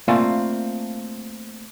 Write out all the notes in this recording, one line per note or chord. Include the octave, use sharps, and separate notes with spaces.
A3 A#3 C4 F4 D5 G#5